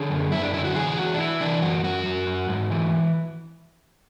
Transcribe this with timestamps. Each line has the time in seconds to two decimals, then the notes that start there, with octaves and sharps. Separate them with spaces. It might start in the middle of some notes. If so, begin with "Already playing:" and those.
Already playing: D3 G#4
0.10 F#2
0.31 F#2 E4
0.42 D4
0.53 D3 E4
0.64 F#4
0.75 E3 G#4
0.96 E3 F#4
1.14 D4
1.19 E3 E4
1.41 E3 D4
1.62 F#2 F#4
1.84 F#2 F#4
2.06 F#2
2.27 F#2
2.48 G#2
2.71 E3